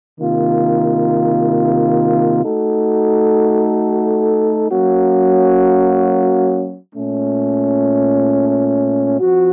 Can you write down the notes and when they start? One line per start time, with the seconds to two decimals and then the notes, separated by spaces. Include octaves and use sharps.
0.20 C3 D#3 A#3 F4
2.44 A3 D#4 F#4 A4
4.70 F#3 A#3 C#4 F#4
6.95 A#2 A3 C#4
9.20 F3 C4 F#4